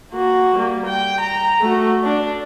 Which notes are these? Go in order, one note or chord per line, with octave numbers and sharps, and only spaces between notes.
A#3 F#4
G3 A#3
G5
A#5
A3 F#4
D4